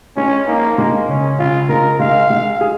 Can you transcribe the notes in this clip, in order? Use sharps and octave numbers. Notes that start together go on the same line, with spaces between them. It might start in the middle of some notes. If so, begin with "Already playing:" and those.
G#3 C#4
A#3 D#4
G#3 A#3
C#3 C#4
C#3 F4
G#3 A#4
G#3 F5
G#3
G#4